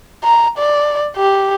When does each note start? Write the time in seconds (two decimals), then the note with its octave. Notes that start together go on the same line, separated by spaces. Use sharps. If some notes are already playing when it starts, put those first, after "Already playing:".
0.24 A#5
0.57 D5
1.16 G4